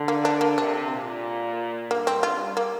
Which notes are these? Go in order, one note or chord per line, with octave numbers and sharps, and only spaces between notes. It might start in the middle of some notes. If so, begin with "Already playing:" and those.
Already playing: D3
A#3
D4
A#3
C3 D4
A#2
G2 A#3
C4
G2 F4
A#3